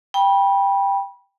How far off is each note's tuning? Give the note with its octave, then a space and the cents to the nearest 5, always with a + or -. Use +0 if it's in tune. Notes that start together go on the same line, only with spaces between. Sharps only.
G5 +15 B5 -25